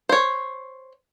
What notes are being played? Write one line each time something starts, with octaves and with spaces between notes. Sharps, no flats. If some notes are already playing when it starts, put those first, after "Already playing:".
C5 C#5